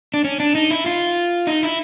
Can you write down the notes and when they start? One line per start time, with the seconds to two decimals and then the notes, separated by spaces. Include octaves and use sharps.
0.14 D4
0.24 C#4
0.40 D4
0.55 D#4
0.71 E4
0.86 F4
1.47 D#4
1.63 E4